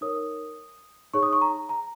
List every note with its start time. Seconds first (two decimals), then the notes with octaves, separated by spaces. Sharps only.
0.01 D#4 A#4 C#5 D#6
1.13 D#4 G#4 C#5 C#6
1.23 D#6
1.33 C#6
1.41 A#5
1.69 A#5